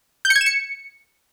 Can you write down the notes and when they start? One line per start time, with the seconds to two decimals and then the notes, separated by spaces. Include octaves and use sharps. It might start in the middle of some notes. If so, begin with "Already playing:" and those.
0.25 G6
0.30 C#7
0.36 G#6
0.41 E7
0.46 C#7